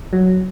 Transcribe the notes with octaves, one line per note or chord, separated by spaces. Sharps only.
F#3